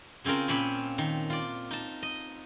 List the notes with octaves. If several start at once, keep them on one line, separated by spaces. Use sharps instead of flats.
C#3 C4 C#4 F4 A#4
A#2 C4 C#4 B5
D#3
F4 D5
D#4 A5
D#5